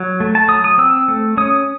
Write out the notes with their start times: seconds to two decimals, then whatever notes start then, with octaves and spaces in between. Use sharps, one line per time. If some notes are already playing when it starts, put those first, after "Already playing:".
Already playing: F#3
0.20 A3
0.35 A5
0.48 F#3 D#6
0.64 D#6
0.78 C4 E6
1.08 A3
1.37 C#4 D#6